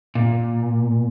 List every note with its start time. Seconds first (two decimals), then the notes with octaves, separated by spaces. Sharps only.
0.15 A#2